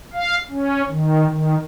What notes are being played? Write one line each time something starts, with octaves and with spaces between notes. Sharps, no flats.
F5
C#4
D#3
D#3